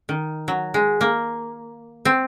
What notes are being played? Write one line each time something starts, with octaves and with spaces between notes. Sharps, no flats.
D#3
F#3
G#3
A#3
C4